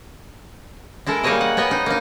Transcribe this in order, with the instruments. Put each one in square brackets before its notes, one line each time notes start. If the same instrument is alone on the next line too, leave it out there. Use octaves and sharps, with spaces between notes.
[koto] G#3 E4 A4 A#4
G3 A#3 D#4 G#4 C#5 D#5
F#5
B3 C#5 D#5 G5 G#5
D#4
A#3 D#4